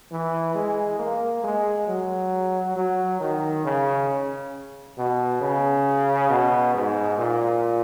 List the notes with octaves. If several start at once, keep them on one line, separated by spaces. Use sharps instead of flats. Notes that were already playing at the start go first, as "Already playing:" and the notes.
E3
G#3
A#3
G#3
F#3
F#3
D#3
C#3
B2
C#3
B2
G#2
A#2